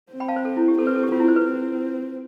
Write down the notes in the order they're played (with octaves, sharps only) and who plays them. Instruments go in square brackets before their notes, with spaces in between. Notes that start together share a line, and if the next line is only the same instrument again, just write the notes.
[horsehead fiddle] C4
[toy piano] G5 B5
F5 A5
C5
A4
E4
G4
[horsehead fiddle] C4 [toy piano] A4
[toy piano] B4
A4
G4
[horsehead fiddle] C4 [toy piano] F4
[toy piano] E4
C5
B4
[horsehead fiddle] C4